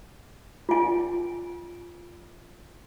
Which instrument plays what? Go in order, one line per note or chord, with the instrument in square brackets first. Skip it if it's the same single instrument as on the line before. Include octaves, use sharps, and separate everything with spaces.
[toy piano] F4 G#5